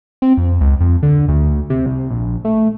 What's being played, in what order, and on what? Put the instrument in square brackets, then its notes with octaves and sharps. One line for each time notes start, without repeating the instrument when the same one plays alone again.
[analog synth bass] C4
F2
C#2
F2
D3
D2
C3
C2
A#1
A3